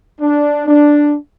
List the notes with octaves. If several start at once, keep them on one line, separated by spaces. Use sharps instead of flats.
D4
D4